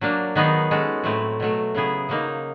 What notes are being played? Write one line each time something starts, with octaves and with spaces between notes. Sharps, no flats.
F#3 A#3 D4
D#3 F#3 B3 D#4 G#4
G#3 C#4 F#4 A4
A2 F#3 A3 C4 E4
B2 F#3 A3
C#3 F#3 B3 E4 G#4
C#3 F#3 A#3 D#4